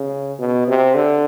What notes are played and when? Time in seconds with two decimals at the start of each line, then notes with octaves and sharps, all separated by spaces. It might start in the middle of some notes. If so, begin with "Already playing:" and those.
Already playing: C#3
0.39 B2
0.67 C3
0.95 D3